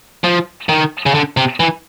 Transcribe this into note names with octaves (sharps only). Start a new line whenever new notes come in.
F3
D#3
C#3
D3
C3
E3